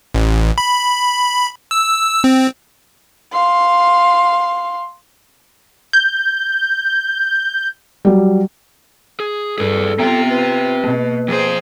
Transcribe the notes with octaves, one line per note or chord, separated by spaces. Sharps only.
A1
B5
E6
C4
F5 C6
G6
F#3 G3
G#4
G2 G#4 A4 B4
B3 C4 F4 G4 G5
B4
B2 A#3
F2 G#4 C5 G5